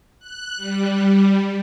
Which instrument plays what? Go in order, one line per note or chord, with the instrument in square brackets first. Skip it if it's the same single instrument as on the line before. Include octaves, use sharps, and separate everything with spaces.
[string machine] F#6
G3